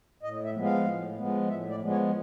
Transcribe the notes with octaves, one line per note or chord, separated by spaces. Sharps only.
A2 D#5
E5
F3 G#3 B3
F5
A2
F3 G#3 B3
A2 E5
D5
F3 G#3 B3
C#5